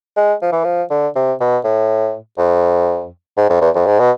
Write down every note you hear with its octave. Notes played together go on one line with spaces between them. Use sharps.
G#3
F3
E3
F3
D3
C3
B2
A2
F2
G#2
F2
E2
F2
G#2
B2